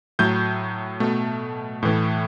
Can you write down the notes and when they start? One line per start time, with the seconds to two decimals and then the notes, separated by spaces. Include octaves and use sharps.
0.19 A2 F#3 A3 G6
1.00 B2 A3
1.83 A2 E3 A3